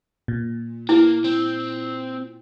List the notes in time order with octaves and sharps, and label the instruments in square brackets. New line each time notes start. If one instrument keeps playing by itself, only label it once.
[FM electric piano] A#2
[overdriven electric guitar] A#3 [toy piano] E4
[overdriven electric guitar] C4